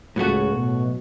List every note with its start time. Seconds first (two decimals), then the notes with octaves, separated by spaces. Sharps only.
0.16 C#2 A2 C#3 F#3 A3 F#4
0.52 B2